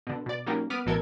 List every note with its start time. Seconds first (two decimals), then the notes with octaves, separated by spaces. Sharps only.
0.07 B2 D3
0.26 B2 D5
0.46 F#3 G3 A#3 C#4 D#4
0.70 B3 D6 F6 B6 D#7
0.86 A1 B2 E3 A4 A#4 G#6